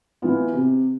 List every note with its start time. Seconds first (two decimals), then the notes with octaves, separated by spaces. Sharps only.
0.22 E3 B3 F4
0.53 C3